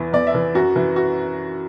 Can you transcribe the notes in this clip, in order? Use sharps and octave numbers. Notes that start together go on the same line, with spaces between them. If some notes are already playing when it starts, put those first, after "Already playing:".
Already playing: E2 E3
E2 D5
E5
E3
F#2 F#4
E3
F#4